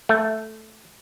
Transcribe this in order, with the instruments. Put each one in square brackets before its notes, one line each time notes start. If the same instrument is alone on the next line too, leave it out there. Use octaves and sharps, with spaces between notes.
[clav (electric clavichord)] A3